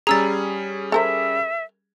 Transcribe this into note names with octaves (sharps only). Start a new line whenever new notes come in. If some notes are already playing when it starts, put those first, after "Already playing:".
G3 C#4 G#4 A#5 E6 A6
A4 A#4 C5 E5